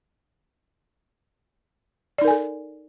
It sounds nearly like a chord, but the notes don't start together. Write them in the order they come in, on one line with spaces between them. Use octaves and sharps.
D5 D#4 A#4 G#5 A4